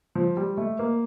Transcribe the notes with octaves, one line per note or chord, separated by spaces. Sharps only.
F3
G3
A3
A#3